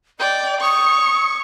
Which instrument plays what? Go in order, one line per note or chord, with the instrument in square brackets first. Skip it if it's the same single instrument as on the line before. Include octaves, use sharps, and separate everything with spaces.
[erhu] D5 [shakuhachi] D#5 [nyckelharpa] G5
[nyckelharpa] C#5 [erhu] C#6 [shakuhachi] D#6